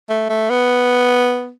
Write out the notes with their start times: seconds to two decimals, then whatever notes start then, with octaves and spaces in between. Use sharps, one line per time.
0.09 A3
0.29 A3
0.50 B3